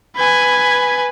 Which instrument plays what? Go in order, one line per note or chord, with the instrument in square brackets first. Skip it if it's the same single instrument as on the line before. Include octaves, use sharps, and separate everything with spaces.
[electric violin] B4 G#5